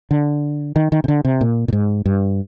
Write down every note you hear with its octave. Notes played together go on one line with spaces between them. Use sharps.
D3
D#3
D#3
C3
D3
C3
A#2
A#2
G#2
G2